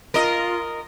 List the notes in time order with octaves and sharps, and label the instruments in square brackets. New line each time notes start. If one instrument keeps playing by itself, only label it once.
[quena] F4 [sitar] A#4 D#5